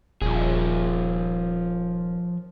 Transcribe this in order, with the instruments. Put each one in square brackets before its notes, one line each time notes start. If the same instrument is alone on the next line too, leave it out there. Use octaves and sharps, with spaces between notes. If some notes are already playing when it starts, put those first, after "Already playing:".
[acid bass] D#1 [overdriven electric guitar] F3 G#4